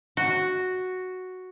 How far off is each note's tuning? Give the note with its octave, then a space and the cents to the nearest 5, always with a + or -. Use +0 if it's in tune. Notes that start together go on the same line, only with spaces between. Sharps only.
F#4 +0